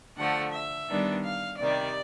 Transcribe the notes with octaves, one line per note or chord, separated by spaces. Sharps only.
D3 F3 A3 F#5
E5
D#3 G3 B3 D4
F5
C3 D#3 G3 D5